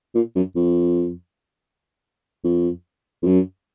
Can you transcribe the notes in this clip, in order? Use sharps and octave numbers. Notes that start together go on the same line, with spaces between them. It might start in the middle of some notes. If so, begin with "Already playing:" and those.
A#2
F#2
F2
F2
F2
F#2